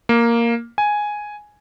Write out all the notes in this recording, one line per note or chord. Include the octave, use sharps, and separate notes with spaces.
A#3
G#5